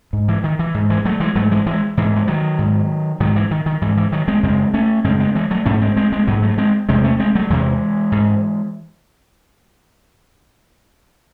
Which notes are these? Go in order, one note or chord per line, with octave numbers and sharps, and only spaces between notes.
G#2
E3
D#3
E3
G#2
E3 G#3
F#3 A3
E3 G#3
G#2 F#3 A3
E3 G#3
E3 G#3
G#2 E3
G#3
D#3 F#3
G#2
G#2 D#3 F#3
E3
D#3
D#3
G#2 E3
E3
D#3 F#3
G#3 C4
F#2 C#3 G#3 C4
A3 C#4
F#2 C#3 G#3 C4
G#3 C4
E3 G#3
F#3 A3
G#2 A3 C#4
G#3 C4
G#3 C4
G#3 C4
G#2 F#3 A3
F#3 A3
G#3 C4
E2 C3 G#3 C4
A3 C#4
G#3 C4
F#3 A3
E2 C3 E3 G#3
G#2